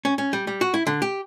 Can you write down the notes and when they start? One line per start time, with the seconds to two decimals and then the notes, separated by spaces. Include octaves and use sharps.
0.05 C#4
0.18 C#4
0.33 G3
0.47 G3
0.61 F#4
0.74 E4
0.87 D3
1.02 G4